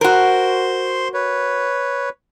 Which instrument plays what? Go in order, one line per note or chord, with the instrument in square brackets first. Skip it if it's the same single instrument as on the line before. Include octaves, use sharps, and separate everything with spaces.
[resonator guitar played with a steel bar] F#4 A#4 [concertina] C5 C6
[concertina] B4 C#5